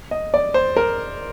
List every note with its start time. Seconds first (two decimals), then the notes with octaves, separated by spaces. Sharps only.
0.11 D#5
0.34 D5
0.54 C5
0.77 A#4